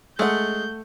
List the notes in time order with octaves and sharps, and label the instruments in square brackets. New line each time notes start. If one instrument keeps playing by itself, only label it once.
[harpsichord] G#3 [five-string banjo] A3 F#5 [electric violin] G6